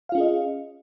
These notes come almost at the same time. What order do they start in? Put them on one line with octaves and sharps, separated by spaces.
F5 F4 C#4 G#4 D#5